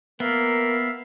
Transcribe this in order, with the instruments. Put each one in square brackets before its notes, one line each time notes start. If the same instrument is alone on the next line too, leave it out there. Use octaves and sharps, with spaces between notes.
[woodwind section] A#3 A#4 [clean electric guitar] B3 [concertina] E5 F5